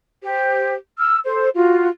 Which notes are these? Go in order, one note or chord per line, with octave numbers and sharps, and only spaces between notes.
G4 C5
E6 F6
A4 C5
F4 F#4